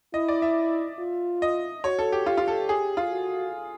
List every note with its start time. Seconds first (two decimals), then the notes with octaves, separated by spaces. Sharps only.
0.14 E4 D#5
0.28 D5
0.42 E5
0.99 F4
1.42 D#5
1.84 F#4 C#5
1.99 A4
2.12 G4
2.26 F4 G4
2.37 F4
2.48 A4
2.69 G#4
2.97 F4
3.11 F#4